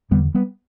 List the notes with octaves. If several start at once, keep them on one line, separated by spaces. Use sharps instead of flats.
E2 D3 G3 B3
G3 B3